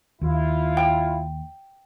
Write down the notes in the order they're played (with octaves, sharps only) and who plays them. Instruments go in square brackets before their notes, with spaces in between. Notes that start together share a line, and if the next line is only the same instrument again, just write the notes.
[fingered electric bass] D#2 [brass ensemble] E4 F4
[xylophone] G5